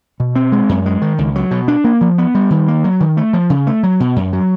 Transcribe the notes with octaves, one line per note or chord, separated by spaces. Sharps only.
B2
C4
G#3
F#2
G#3
D#3
C#2
F#3
B2
D4
A#3
F3
B3
G3
D#3
A#3
F#3
D#3
A3
F3
C#3
A3
F#3
B2
F#2
F#3